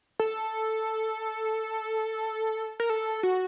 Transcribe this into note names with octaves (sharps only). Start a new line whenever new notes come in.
A4
A#4
A4
F#4